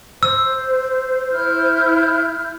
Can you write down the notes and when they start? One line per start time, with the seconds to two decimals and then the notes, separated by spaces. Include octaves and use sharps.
0.23 C5 E6
1.32 E4 F6 G6